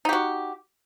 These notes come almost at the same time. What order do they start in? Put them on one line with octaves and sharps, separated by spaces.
D#4 G4 F#4